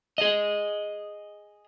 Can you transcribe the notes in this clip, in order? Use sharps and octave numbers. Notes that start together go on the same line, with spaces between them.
G#4 D#5